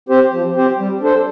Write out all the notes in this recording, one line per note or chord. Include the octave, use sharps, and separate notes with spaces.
C4 G4 C5
F3
C4 G4 C5
G3
D4 A4 C5